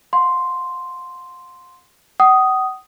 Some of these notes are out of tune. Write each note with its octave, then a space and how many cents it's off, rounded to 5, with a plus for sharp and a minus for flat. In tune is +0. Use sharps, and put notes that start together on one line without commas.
F5 +45 C6 +0
F#5 +40 D#6 +0